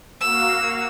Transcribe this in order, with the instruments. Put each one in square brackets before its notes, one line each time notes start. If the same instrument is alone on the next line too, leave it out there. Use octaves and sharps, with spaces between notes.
[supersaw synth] A#3 F#4 F5 [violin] E6